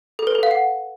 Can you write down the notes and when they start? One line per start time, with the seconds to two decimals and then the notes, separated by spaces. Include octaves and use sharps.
0.19 A4
0.27 B4
0.35 A4
0.43 F5
0.51 F#5